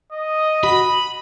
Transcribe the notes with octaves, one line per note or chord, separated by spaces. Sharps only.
D#5
F#4 B5